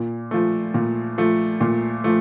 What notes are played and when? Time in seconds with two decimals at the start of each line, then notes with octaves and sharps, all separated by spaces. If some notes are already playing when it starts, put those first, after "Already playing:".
Already playing: A#2
0.31 F3 A3
0.74 A#2
1.18 F3 A3
1.61 A#2
2.04 F3 A3